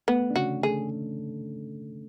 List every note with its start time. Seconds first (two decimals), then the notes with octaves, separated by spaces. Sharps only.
0.08 A3 B3
0.30 D4
0.36 C#3 C#4 F#4
0.63 A3 G#4 A4